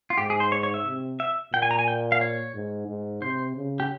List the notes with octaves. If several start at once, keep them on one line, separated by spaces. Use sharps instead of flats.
F4
G#2 G4
G#4
C5
C#5
C#5
E5
C3
E5
A#2 G5
G#5
A#5
G#5
G5
F5
C#5
G#2
G#2
C3 C5
C#3
G4